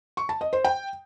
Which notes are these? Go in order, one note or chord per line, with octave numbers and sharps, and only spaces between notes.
C#6
A5
D#5
C5
G5